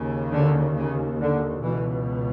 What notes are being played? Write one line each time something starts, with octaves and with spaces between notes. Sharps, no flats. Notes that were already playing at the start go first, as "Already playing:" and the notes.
Already playing: D#2 C#3
D3
C#3
D3
C#2 B2 E3